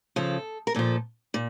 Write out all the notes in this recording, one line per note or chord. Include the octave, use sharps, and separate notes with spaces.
C#3 F3 A4
A#4
A#2 F3 A4
A#2